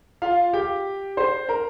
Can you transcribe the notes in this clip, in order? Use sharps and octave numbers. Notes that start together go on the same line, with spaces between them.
F4 F5
G4 G5
C5 C6
A#4 A#5